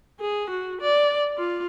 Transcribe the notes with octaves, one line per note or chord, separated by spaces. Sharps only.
G#4
F#4
D5
F4